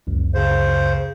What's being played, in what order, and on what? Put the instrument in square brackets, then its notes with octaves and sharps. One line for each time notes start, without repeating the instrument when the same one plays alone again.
[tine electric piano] G1 C#2 F#2
[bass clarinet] C#3 [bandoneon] C5